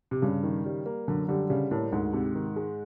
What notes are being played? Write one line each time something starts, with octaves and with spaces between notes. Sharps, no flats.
C3
G2 C#3
D#3
G3
A#3
F#2 D3
D3 G3
C#3 G3
A2 A#3
D2 G#2
C3
D#3
G#3